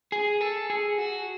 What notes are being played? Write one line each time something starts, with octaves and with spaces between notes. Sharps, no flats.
G#4
A4
G#4
F#4